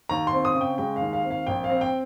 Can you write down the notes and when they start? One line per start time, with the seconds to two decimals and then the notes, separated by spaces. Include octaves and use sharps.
0.09 D#2 A#5
0.27 C6
0.33 C4
0.45 D#6
0.55 C#3
0.61 G5
0.78 G#3 G5
0.96 D#2 F5
1.13 F5
1.24 C4
1.30 F5
1.47 A#1 G5
1.64 F5
1.70 C4
1.81 G5